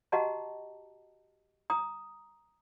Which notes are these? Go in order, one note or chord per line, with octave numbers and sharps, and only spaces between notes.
F#4 G4 D#5 F#5 A5 A#5
A#5 D#6